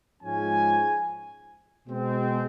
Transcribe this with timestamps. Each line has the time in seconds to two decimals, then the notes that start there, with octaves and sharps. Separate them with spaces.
0.21 G#2 F3 G#3 C#4 G#5
1.86 B2 G#3 C4